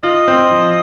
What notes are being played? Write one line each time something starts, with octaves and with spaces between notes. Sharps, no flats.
F4 D#5
C4
F3